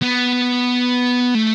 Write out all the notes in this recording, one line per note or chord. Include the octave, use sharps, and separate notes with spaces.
B3
A3